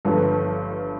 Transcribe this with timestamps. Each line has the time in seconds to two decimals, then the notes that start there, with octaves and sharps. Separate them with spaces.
0.05 G1 G2 F3 B3 A4